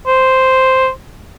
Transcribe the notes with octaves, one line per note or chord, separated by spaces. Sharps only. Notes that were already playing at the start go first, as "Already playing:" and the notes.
C5